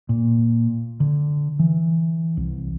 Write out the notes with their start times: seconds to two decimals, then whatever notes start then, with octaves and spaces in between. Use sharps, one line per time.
0.09 A#2
1.00 D3
1.59 E3
2.37 C2